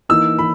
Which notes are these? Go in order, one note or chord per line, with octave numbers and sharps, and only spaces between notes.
E3 A#3 D#4 E6
E3 B5